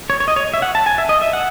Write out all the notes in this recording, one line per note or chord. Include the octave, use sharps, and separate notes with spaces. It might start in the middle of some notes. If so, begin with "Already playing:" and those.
C#5
C#5
D#5
C#5
E5
F#5
A5
G#5
E5
D#5
E5
F#5